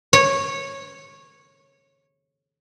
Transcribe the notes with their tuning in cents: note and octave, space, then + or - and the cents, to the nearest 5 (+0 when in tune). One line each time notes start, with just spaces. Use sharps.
C#5 -15